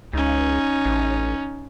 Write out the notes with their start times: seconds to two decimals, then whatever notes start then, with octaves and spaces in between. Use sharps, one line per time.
0.13 C#2 C#4 D#4
0.85 A1